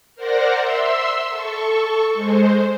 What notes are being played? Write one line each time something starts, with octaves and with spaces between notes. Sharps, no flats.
A#4 C5 D5 F#5 A#5
E5 C6 E6
A4 C#6
G#3 C5